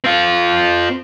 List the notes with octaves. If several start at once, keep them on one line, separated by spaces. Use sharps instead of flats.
C4 F4